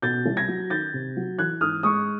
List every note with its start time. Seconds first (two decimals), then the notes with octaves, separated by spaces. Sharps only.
0.02 B2 G6 A6
0.26 C2
0.37 G#6 A#6
0.48 F#3
0.70 D#3 G6 A6
0.94 C3
1.17 F#3
1.38 E3 F#6 G#6
1.61 G#2 D#6 F6
1.83 G#3 C#6 D#6